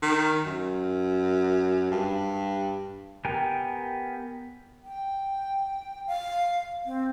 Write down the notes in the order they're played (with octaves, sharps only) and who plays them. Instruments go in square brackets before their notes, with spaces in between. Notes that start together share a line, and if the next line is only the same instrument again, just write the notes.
[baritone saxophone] D#3
F#2
G2
[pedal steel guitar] B3 G4 A#4 G5 G#5
[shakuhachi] G5
F5
C4